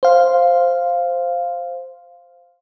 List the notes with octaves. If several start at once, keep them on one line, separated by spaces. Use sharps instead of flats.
C5 F5